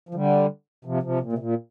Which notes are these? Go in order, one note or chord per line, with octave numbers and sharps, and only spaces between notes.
F3
D3 G3
C3 F3
C3 F3
A#2
C3
A#2